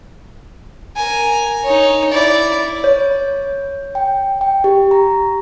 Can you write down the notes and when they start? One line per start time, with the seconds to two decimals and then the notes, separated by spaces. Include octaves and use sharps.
0.97 A#4 G#5
1.63 D#4 C#5
2.12 E4 D5
2.84 C#5
3.95 G5
4.41 G5
4.64 G4
4.91 A#5